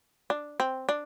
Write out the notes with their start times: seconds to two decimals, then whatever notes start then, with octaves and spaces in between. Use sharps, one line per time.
0.30 D4
0.60 C4
0.89 D4